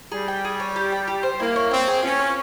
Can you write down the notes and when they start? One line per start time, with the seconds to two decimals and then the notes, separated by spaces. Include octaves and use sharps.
0.12 G3 G#4
0.28 G5
0.45 G#4
0.60 C#5
0.76 G4
0.92 G5
1.08 G4
1.23 C5
1.40 A#3 E4
1.56 C#5
1.71 C4 G5
1.87 G#4
2.03 C#4 F4
2.19 C#5